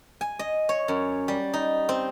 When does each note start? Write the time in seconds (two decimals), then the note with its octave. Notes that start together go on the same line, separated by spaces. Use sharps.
0.21 G#5
0.39 D#5
0.69 C#5
0.88 F#2
1.28 G3
1.54 D#4
1.89 C4